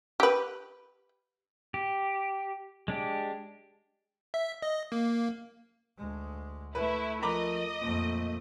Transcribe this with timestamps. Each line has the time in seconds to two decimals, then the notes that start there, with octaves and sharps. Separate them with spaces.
0.20 G4 B4
1.74 G4
2.88 G#3 D4 G4
4.34 E5
4.62 D#5
4.92 A#3
5.98 D2 G#3
6.75 A3 E4 B4
7.22 F3 A#4 D#5 A#5 B5 D6
7.81 F2 A#2 A3